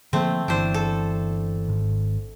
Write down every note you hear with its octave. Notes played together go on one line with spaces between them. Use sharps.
D3 F3 A3 A#3 C4
G1 E3 D4 C5
A4
G#1